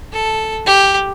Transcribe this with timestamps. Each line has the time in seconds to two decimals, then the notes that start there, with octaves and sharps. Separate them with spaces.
0.13 A4
0.66 G4